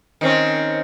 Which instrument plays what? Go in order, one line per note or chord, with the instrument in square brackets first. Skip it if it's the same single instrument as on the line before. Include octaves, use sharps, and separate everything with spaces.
[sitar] D#3 C4 C#4